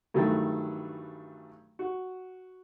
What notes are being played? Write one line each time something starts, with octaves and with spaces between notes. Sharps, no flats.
G2 D#3 E3 F#3 A3
F#4